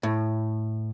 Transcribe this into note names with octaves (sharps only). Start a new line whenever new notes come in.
A2